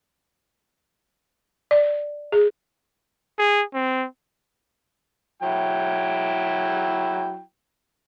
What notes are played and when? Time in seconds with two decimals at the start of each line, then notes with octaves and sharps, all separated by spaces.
1.71 D5
2.32 G#4
3.39 G#4
3.74 C4
5.43 F#3 E4 G5